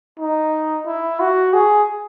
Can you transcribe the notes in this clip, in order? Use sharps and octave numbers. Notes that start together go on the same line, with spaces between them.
D#4
E4
F#4
G#4